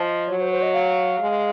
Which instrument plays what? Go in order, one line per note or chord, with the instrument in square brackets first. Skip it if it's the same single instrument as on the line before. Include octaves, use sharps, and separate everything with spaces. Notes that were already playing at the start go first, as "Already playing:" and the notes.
Already playing: [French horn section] F3 [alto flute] D#5
[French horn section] F#3 [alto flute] C#5
[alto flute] C5
C5
D#5
F5
[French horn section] G#3